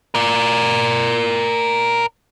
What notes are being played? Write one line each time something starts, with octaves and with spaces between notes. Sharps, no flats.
A#4 D5